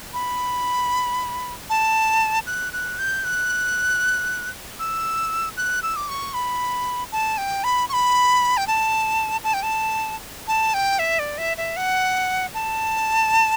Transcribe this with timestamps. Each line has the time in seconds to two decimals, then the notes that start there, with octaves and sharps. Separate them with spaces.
0.14 B5
1.70 A5
2.47 F#6
2.73 F#6
2.99 G6
3.24 F#6
4.79 E6
5.57 F#6
5.83 E6
5.96 D6
6.08 C#6
6.34 B5
7.12 A5
7.38 G5
7.64 B5
7.89 C#6
7.93 B5
8.57 G5
8.67 A5
9.44 A5
9.54 G5
9.63 A5
10.47 A5
10.74 G5
10.99 E5
11.19 D5
11.38 E5
11.57 E5
11.77 F#5
12.54 A5